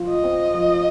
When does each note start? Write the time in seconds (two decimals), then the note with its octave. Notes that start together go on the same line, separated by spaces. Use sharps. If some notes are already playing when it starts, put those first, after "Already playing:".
Already playing: F3 F4
0.09 D#5
0.24 C4
0.54 F3